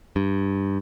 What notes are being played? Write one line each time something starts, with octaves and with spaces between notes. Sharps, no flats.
G2